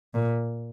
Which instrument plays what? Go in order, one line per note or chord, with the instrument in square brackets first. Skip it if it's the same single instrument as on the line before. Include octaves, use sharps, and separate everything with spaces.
[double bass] A#2